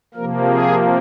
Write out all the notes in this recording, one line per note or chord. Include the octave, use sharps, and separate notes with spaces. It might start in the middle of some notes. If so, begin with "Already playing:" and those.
C3 F3 A#3 A#4
G#4